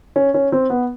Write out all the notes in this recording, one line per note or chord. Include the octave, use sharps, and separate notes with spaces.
C#4
C#4
C4
B3